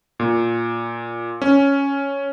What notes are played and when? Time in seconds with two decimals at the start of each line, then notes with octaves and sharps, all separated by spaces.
0.20 A#2
1.42 C#4